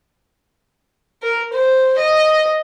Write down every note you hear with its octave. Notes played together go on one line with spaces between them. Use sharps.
A#4
C5
D#5